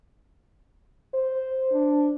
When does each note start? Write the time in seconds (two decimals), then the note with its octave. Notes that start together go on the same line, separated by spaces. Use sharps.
1.14 C5
1.72 D4